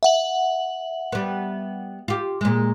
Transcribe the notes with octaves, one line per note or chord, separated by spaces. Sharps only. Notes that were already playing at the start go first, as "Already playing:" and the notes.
E5 F#5 F#7
G3 B3
F4 G4
A#2 G#3